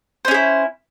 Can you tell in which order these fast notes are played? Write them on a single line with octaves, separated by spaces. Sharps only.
C5 C#4 G#4 E4